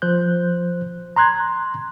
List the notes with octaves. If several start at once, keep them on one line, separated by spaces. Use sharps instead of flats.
F3 C5 F#6 G6
A#5 C6 F#6 G#6